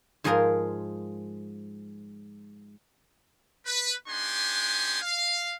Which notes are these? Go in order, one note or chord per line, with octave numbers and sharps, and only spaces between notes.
G#2 F3 G#3 G#4 A#4 A#5
B4
B3 D4 D#4 G4 G#5 C6
F5